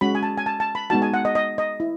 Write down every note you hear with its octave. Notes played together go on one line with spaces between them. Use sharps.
G#3 C#4 F#4 B5
G#5
A5
G#5
A5
A5
B5
G#3 B3 D#4 F#4 A5
G#5
F#5
D#5
D#5
D#5
E4